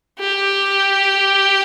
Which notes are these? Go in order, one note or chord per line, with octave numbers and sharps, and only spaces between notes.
G4